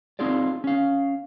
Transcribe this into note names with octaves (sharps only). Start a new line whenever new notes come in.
C4 D#4 F4 G#4 D5
C#4 F5